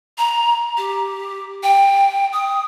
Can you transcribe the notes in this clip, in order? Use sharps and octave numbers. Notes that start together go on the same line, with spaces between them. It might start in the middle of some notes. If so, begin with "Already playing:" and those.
A#5
G4
G5
D#6